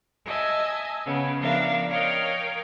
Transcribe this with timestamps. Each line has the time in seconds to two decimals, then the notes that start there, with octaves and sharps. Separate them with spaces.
0.25 D#5 E5 G#5 A5
1.05 C#3 B3
1.39 F3 B3 D4 A#4 E5 F5
1.89 A#4 C#5 D#5 F5 G5